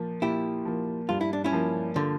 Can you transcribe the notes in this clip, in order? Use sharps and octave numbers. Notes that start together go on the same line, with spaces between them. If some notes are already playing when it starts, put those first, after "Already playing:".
Already playing: A#2 F3 A#3
A#2 E4 G4
F3 A#3
G2 F4
E4
D4
C#4 E4
F3 A#3
D3 F3